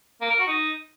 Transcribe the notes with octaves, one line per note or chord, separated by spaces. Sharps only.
A#3
A#4
F#4
D#4